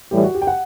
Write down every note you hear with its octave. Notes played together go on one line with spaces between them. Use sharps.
A2 E3 G3 G4
F#4
G4
G5
F#5